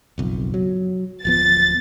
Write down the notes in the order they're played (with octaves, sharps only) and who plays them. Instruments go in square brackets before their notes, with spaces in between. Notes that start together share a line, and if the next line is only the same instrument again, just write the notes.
[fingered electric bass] F#1 B1 F2
F#3
[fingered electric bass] D1 F3 B3 [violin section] A6